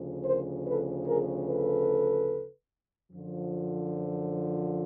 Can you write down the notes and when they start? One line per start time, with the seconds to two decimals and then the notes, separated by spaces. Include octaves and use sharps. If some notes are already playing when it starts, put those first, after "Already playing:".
Already playing: D2 C#3 F3
0.25 A#4 C5
0.66 A4 B4
1.07 G#4 A#4
1.47 A4 B4
3.12 F#2 D3 F3